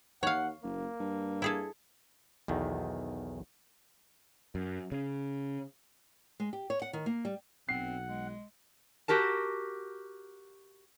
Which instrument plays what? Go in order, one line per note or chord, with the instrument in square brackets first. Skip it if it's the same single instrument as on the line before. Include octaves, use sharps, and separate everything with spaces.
[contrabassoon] D#2 [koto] C#5 F5 [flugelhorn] F#5
[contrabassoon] F#1 [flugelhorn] A#3
[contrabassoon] G2
[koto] E4 G#4 A4
[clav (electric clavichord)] B1 E2 D#3
[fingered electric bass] F#2
C#3
[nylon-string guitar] G#3
G4
C#5
F#5
D#3
A#3
G3
[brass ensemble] B1 [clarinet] C4 [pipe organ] F#5 [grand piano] C7
[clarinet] G#3
[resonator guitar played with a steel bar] F#4 G4 A#4 A5